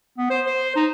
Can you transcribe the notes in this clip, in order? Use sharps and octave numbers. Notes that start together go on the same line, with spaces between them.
B3
C5
C5
D#4